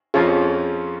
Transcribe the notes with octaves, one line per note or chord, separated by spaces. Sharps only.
F2 F3 C#4 F4 G#4